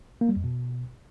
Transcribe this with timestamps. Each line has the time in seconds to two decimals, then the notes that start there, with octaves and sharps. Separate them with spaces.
0.21 A#3
0.29 G3
0.36 F2
0.44 B2